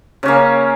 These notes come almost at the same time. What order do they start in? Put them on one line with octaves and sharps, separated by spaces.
C#3 C#4 A#3